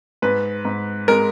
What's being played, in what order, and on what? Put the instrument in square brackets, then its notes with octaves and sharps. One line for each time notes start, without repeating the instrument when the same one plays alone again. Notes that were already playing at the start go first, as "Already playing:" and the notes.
[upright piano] G#2 B4
G#2
G#3 A#4